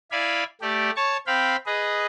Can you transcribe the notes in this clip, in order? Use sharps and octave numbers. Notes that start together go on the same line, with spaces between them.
E4 D5 F5 G#5 B5
A3 G4 D5
C#5 A5 C#6
C4 F5 G5 B5
G#4 B4 D#5